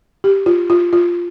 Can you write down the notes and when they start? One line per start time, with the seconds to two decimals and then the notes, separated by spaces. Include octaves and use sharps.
0.24 G4
0.46 F4
0.70 F4
0.93 F4